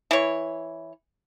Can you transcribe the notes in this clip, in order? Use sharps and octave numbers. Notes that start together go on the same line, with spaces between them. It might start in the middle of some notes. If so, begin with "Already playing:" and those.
E3 C#5